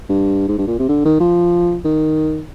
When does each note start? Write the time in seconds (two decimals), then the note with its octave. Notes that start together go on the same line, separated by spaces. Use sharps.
0.09 G2
0.48 G#2
0.58 G2
0.67 A#2
0.79 C3
0.89 D3
1.05 D#3
1.20 F3
1.85 D#3